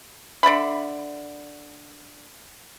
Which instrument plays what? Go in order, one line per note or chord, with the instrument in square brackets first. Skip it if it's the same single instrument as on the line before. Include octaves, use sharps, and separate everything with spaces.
[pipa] D3 D5 E5 B5